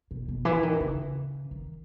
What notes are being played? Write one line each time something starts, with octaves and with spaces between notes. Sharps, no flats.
B2
B2
E3
D#3
B2
C#3
D#3